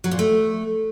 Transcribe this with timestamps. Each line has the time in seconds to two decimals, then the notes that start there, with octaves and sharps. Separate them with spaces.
0.04 F#3
0.11 A#2
0.19 A3